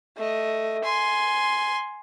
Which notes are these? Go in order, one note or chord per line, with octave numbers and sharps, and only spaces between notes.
A3 D#5
G#5 C6